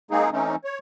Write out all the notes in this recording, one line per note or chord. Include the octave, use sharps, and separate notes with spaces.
G#3 A#3 C4 D#4 G#4
E3 A3 C4 C#4 D#4
C#5